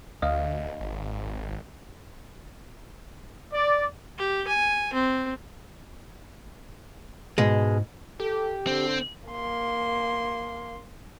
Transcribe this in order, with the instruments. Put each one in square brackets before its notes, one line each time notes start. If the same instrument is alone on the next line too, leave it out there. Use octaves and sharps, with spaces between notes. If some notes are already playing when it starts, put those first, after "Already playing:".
[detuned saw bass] D2 [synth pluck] D#5 F5
[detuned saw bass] G#1
[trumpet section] D5
[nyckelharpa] G4
G#5
C4
[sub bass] G#2 [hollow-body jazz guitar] B2 G#3
[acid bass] G4 [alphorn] A4
[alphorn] D3 [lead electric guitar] C4
[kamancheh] A#3 C6